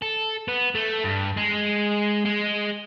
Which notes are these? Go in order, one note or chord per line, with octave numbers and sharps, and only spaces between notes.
A4
B3
A3
G2
G#3
G#3